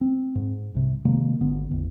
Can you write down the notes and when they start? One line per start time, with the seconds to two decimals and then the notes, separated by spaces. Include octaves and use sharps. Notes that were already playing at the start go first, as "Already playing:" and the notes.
0.01 C4
0.35 G#2
0.75 C2 C3
1.05 C3 D#3 G#3 A#3
1.41 G#1 D3 B3
1.71 A1 E2